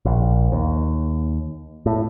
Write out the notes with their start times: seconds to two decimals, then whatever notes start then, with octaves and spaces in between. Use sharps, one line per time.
0.05 A#1
0.52 D#2
1.86 A2